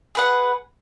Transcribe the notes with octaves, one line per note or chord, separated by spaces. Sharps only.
G#4 B4 F#5